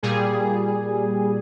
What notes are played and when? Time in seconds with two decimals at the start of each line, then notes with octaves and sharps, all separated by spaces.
0.03 A#2 G3 G#4